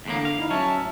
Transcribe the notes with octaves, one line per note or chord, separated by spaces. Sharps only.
E2 A2 D3 A#3
F5
D#4 E4
F#3 C#4 E5 A5
A2